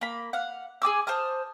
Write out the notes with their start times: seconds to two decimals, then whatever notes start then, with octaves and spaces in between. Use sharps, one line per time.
0.01 A#3 B5
0.33 F5 F#5
0.82 G#4 G#5 D6 E6
1.07 C5 A5 D#6 F6